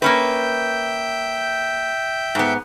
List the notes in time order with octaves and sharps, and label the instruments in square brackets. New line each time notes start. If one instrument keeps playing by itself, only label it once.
[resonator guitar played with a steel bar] A#3 C#4 B4 [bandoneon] E5 G5 G6
[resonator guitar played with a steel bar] G#2 B3